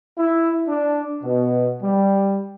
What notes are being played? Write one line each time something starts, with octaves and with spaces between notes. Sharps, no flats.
E4
D4
B2
G3